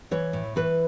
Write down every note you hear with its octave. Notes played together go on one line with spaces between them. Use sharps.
E3 C#5
A2
E3 B4